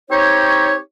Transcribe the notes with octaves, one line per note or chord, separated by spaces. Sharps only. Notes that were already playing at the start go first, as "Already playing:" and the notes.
C4 D#4 G4 C#5